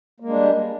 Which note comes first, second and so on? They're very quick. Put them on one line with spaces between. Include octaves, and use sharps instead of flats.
A#3 G#3 D4 G3